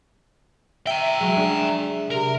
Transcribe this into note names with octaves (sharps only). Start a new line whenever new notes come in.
E5 G5 A#5
F#3 G#3
G#3 D4
C3 A#4